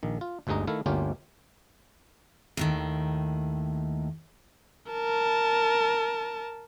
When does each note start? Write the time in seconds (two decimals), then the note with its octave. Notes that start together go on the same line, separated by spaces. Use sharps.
0.03 A#1 D#3
0.21 F4
0.47 G1 D2 G2 G#3 D#4 A#5
0.67 D#3 A3 E4 F5
0.86 G1 D2 A#3 C#4 F4 G4
2.57 D#2 A2 D#3
4.92 A#4 A5